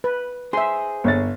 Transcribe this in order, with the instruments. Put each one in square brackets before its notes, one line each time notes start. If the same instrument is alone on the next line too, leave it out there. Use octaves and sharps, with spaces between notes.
[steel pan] B4
[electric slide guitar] G#4 C5 [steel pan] E5 C6
[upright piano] G1 C#5 A6